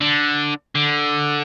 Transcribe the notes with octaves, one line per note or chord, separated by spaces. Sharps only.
D3
D3